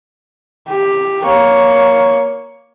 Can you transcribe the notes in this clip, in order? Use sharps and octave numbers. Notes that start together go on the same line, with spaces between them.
G4
A#3 C#5